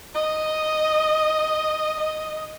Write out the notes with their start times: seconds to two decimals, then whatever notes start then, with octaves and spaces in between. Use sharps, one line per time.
0.15 D#5
2.00 D#5